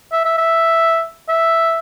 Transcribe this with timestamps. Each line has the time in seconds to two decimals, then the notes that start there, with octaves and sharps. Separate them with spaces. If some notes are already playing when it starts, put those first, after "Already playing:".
0.12 E5
0.25 E5
0.38 E5
1.29 E5